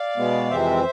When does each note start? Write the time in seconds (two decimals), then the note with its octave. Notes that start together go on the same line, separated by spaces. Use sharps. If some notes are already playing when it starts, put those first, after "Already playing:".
Already playing: D5 F5
0.17 B2 G#3 B3
0.50 F2 C3 E3 G#3 C4 C5 E5